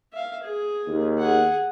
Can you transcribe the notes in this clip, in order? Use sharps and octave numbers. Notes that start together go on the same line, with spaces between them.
E5 F5
G#4
D#2
G#4 F#5